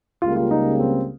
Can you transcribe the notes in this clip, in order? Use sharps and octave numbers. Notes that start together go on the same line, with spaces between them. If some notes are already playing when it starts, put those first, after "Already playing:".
C#2 C#3 G3 A#3 F4
F4
D#4
C4